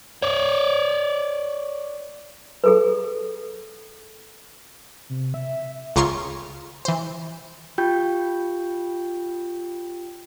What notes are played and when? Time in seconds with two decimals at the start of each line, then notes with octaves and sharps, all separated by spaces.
0.22 C#5 D5
2.64 G#4 A4 B4
5.10 C3
5.34 E5
5.96 C#2 C#3 F4 A#5 C6 C#6
6.85 E3 C5
7.78 F4 G4 G5 G6